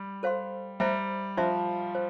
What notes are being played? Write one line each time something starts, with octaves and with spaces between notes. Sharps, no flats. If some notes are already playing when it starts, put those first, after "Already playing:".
Already playing: G3
A4 C5 F5 C6
G3 C5 E5 A#5
F3 C5 E5 A5 C6
C5